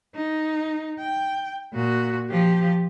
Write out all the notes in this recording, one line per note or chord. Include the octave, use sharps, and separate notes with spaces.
D#4
G5
A#2 F#4
F3 G4